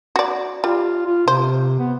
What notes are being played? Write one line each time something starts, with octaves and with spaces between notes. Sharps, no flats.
F#4 D5
G3 F4
F4
C3 C5
B3